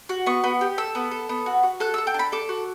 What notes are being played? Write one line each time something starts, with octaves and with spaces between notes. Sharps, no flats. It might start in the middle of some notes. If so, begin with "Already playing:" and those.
F#4
B3 C#6
B3
G4
A4 E6
B3
A4
B3
F#4
F#4
A4 F#6
E6
A4
G5
D4
B5
A4 D6
F#4